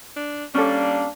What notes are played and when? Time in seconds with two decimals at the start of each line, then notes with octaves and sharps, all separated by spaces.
0.16 D4
0.54 G3 A#3 C#4 D4 A4